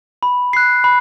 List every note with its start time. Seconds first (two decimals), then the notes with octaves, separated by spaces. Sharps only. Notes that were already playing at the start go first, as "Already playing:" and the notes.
0.23 B5
0.53 F#6 C7
0.84 B5